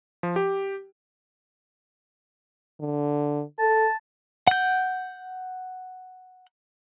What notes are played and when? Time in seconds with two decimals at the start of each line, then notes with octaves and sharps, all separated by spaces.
0.23 F3
0.36 G4
2.80 D3
3.59 A4 A5
4.47 F#5 G6